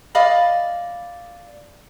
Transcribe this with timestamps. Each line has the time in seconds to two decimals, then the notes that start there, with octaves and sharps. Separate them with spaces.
0.15 D5 D#5 F5 B5